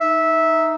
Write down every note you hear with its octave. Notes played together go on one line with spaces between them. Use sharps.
D#4 E5